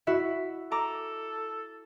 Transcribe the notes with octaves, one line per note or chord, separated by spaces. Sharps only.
E4 F#4 E5
A4 A#5 D6